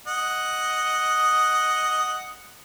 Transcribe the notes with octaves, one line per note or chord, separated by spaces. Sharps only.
D#5 F#5